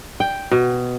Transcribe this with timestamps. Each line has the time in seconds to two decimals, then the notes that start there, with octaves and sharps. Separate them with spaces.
0.20 G5
0.52 B2